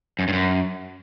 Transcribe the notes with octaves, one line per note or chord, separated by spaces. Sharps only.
F#2
G2
F#2